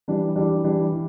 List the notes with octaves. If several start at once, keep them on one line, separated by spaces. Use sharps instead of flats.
E3 G3 D4
E3 G3 D4
E3 G3 D4
E3